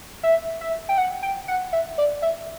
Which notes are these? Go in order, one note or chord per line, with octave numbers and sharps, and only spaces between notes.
E5
E5
G5
F#5
G5
F#5
E5
D5
E5